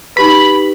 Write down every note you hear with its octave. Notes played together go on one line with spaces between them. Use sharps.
D#4 G4 B4 B5